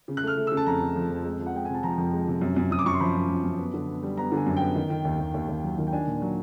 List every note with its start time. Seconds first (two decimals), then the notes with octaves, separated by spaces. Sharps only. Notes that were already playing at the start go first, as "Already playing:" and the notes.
0.08 C#3
0.17 F#6
0.23 A3 F6
0.37 A3
0.47 E6
0.52 C#3
0.57 A5
0.66 F2 A#5
0.81 C#3
0.96 F3
1.10 F2
1.25 G#3
1.39 F3
1.46 F#5
1.54 G#3 G5
1.65 C3 G#5
1.74 A5
1.83 F3 A#5
1.98 F2
2.13 G#3
2.27 C3
2.41 F#2
2.56 F#2
2.71 F#2 D#6
2.79 D6
2.86 F#2 C#6
2.93 C6
3.00 F3 B5
3.15 F#2
3.29 F#2
3.44 F#2
3.58 B3
3.74 D3
3.88 B3
4.03 G3
4.17 B3 A#5
4.32 D3
4.37 G#5
4.46 F#2
4.57 B3 G5
4.75 D#3
4.90 D#3
5.05 D#2
5.19 D#2
5.34 D#2
5.49 D#2
5.64 F#3
5.78 D#3
5.87 G5
5.93 D4 G#5
6.07 A#2
6.22 F#3